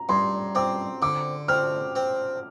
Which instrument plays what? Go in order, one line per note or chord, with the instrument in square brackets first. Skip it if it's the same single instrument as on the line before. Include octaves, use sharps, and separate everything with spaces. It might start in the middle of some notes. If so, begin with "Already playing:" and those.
Already playing: [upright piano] A#5
[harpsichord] G2 [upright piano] C6
[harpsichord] C4 [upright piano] D6
[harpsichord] D3 [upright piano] D6
[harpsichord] C4 [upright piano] F6
[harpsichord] C4